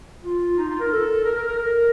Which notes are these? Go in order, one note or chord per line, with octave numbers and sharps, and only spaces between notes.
F4
D#4
F4
A#4
A4
A#4
A#4
A#4
A#4